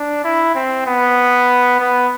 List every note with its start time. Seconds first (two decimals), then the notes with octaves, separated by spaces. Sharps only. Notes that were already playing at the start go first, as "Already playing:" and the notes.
Already playing: D4
0.24 E4
0.55 C4
0.87 B3
1.80 B3